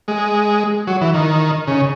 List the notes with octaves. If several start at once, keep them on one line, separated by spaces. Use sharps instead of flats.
G#3
F#3
E3
D#3
C#3